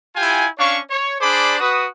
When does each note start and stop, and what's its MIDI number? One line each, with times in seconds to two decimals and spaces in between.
0.16 0.46 64
0.16 0.46 65
0.16 0.46 67
0.16 0.46 79
0.16 0.46 80
0.58 0.78 61
0.58 0.78 62
0.58 0.78 73
0.58 0.78 77
0.58 0.78 85
0.90 1.15 73
1.20 1.57 62
1.20 1.57 68
1.20 1.57 72
1.20 1.57 74
1.20 1.57 83
1.20 1.57 86
1.60 1.85 66
1.60 1.85 71
1.60 1.85 87